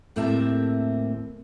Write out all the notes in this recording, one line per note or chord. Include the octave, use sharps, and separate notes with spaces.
D#2 A2 A#3 C4 E5 A5